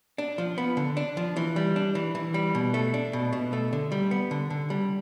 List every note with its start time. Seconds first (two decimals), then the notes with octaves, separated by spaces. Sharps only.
0.18 D4
0.38 F3
0.58 B3
0.77 D3
0.97 D4
1.17 F3
1.37 E3
1.56 G3
1.76 D4
1.95 E3
2.15 E3
2.34 G3
2.55 B2
2.74 A3
2.94 D4
3.13 B2
3.33 B2
3.53 A3
3.73 D3
3.92 G3
4.11 B3
4.31 D3
4.50 D3
4.70 G3